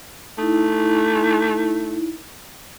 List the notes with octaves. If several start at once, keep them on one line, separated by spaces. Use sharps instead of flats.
A3 D#4 E4